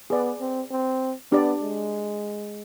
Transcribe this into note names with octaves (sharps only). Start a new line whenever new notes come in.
B3 G#4 B4 D5
C4
C4
B3 D4 G4 D5
G#3